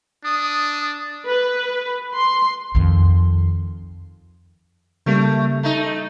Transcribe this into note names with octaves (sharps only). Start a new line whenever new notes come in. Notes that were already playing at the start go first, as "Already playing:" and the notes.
D4 D#6
B4
C6
F2 D#3
C#3 G3 A3 A#3
A3 D#4